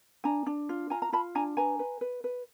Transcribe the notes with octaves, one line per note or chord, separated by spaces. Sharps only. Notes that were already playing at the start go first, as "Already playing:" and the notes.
D4 G#5 A#5
D4
F4
F4 G#5 A#5
A#5
F4 A5 B5
D4 G#5 A#5
B4 G#5 A#5
B4
B4
B4